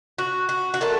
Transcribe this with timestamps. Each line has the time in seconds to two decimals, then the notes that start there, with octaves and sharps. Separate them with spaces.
0.18 F#4
0.49 F#4
0.74 F#4
0.81 A#2 A3 A4